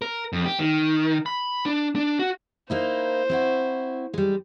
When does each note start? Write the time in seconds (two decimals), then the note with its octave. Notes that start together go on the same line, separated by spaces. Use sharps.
0.02 A#4
0.33 F2
0.46 G4
0.60 D#3
1.26 B5
1.66 D4
1.96 D4
2.19 F#4
2.70 A#3 D#4 E4 C5
3.30 C4 E4 F#4
4.14 G3 G#3